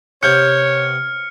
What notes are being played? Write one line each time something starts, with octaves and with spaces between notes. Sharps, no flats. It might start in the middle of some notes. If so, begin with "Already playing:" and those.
C3 B3 C#5 F6 G6 C#7